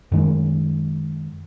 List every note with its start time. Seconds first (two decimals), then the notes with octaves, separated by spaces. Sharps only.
0.12 F#2 D#3 G#3